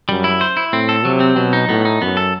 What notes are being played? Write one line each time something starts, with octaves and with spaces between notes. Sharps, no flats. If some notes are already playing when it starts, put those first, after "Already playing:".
F#2 G3
E4
C5
E4
A2 C4
A4
C3 F#3
C4
B2 F#3
D#4
A2 B3
D#4
F#2 B3
A4